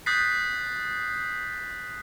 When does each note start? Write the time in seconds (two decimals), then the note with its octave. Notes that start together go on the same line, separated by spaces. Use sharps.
0.06 D#6 F#6 G6 A6 B6 C7